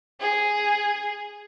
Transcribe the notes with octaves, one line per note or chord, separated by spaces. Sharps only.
G#4